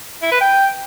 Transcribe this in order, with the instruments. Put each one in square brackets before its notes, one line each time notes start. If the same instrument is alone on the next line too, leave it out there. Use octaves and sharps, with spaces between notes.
[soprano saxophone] E4
B4
G5